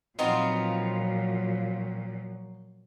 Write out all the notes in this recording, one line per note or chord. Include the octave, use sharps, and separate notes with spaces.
A#2 F3 F#3 B3 C4 D#4 F4